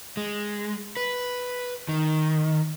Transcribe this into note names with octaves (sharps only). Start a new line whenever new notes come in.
G#3
B4
D#3